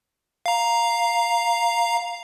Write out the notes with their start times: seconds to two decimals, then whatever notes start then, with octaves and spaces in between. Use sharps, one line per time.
0.46 F5 A#5